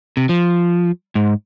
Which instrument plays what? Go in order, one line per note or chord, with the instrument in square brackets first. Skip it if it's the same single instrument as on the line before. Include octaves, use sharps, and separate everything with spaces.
[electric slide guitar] C3
F3
G#2